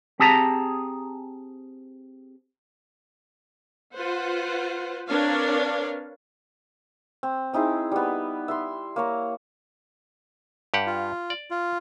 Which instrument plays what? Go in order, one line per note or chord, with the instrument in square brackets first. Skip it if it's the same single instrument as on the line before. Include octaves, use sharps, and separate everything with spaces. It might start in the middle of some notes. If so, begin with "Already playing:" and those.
[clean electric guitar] C4 G4 G#4 A5 A#5
[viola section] F4 B4 C5 F#5
C4 D4 A#4 B4 C#5 F5
[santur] C4
C4 D#4 E4 G#4
G3 B3
E5 B5 C6
A#3 C#5 A#5
[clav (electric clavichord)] G2 G4 F#5
[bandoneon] F4
[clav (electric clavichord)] D5
[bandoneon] F4